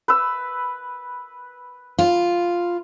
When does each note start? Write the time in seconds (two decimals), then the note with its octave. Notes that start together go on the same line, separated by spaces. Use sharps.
0.08 B4 E6
1.99 F4